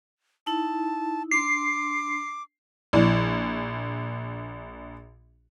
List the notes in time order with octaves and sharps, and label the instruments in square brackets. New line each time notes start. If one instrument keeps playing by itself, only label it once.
[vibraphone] D#4 E4 [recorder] A5
[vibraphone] D4 C6 [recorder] D6 [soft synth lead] C7
[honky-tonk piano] A#1 [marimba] F3 E4 D5